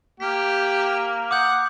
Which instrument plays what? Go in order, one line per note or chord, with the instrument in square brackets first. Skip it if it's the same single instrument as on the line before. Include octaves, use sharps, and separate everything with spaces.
[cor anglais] A#3 [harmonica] G4 [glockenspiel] B6
[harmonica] F#5 [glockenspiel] D6 D#6 G6